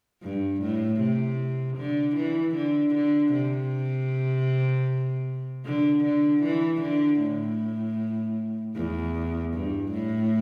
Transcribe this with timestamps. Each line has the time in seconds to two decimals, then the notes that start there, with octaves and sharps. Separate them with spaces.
0.23 G2
0.62 A2
1.00 C3
1.77 D3
2.16 E3
2.55 D3
2.95 D3
3.33 C3
5.65 D3
6.04 D3
6.43 E3
6.81 D3
7.20 A2
8.75 E2
9.53 G2
9.92 A2